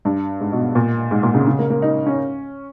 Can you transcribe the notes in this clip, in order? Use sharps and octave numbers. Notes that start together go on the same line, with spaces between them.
G2
G#2
B2
A#2
G#2
A#2
C#3
C#3
A#3
A#3
D#4
C#4